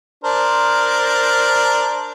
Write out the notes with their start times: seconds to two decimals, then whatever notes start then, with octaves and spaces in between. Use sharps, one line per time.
0.24 D4 A#4 C5